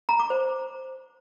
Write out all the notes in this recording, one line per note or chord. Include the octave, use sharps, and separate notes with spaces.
A#5
D6
C5